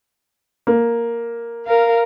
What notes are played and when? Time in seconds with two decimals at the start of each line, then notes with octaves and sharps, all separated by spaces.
0.67 A#3
1.67 A#4 F5